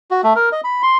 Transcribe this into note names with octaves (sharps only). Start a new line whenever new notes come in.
F#4
A3
A#4
D#5
B5
C6